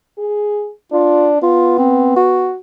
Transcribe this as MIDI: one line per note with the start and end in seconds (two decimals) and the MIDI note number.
0.18 0.70 68
0.92 1.40 62
0.92 1.30 65
1.42 2.51 59
1.42 1.78 65
1.78 2.13 60
2.16 2.57 66